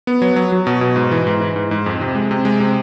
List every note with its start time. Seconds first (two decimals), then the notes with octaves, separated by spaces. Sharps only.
0.07 B3
0.22 F#3
0.36 F#3
0.52 F#3
0.67 B2
0.81 B2
0.96 G#2
1.11 E3
1.27 G#2
1.41 E3
1.56 G#2
1.71 G#2
1.86 F2
2.01 C3
2.15 G#3
2.31 C3
2.45 G#3
2.60 C3